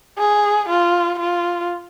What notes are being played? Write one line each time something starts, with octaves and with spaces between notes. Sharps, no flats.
G#4
F4
F4